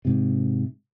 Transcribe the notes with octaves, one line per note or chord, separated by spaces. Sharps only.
G#2 C3